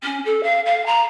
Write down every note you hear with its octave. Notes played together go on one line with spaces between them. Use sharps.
C#4
A4
F5
F5
A#5